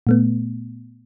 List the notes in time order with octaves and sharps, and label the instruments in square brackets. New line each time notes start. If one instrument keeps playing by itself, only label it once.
[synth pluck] A#2 A3 B3